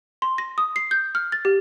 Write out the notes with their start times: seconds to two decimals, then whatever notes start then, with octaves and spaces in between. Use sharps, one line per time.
0.22 C6
0.38 A#6
0.58 D#6
0.76 C7
0.91 G6
1.15 F6
1.32 A6
1.45 G4